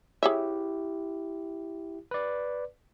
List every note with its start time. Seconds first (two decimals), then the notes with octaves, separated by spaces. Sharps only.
0.23 E4 G4 G#4 C#5 E5
2.11 B4 D5